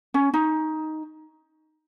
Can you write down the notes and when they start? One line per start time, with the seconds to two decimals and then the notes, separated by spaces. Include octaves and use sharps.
0.14 C#4
0.34 D#4